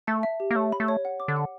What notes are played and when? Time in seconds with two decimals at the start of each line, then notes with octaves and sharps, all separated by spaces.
0.07 A3 A5
0.23 E5
0.40 G4
0.51 A#3
0.55 A3 C#5
0.72 B5
0.80 A3
0.88 C#5
1.05 F#5
1.20 D6
1.28 D3
1.36 F#5